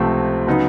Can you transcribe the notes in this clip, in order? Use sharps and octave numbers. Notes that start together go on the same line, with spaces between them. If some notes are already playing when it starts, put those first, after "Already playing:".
Already playing: C#2 C3 F3 A3 C4
C#3 F#3 B3 D#4